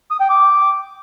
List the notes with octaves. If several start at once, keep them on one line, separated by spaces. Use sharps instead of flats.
D#6
G5
D6